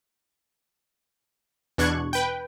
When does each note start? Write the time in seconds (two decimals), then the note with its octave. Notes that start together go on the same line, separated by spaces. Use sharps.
1.78 E2 B2 D4 C#6 F#6 G#6
2.13 B4 G5